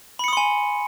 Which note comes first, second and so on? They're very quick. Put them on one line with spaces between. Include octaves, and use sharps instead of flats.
B5 C#7 D#6 C6 G#5